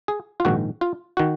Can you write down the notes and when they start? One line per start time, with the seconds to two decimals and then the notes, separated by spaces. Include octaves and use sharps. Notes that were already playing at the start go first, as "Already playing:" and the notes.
0.08 G#4
0.40 F4
0.45 A#1 G#2 D#3 F#4
0.81 F4
1.17 D#3 F#4